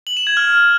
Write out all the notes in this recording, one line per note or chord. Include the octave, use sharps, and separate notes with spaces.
F#7
E7
G#6
F6